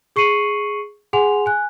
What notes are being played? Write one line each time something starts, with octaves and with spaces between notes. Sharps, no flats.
G#4 C#6 C7 C#7 D#7 F#7
G#4 F#5 G#5 C6 F7
G#5 F#6